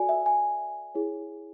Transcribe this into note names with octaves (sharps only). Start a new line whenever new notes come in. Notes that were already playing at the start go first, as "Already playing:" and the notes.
Already playing: F#4 A4 D5 G#5
E5
G#5
E4 G#4 C#5